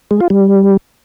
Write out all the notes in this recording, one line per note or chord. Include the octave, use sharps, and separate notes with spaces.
G#3
F4
G3